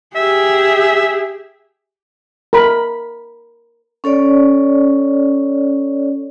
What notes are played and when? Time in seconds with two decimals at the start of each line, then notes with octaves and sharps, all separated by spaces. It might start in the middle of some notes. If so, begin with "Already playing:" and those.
0.16 G4 G#4 E5
2.53 A#4 B5
4.04 C#4 A4 C#5 D5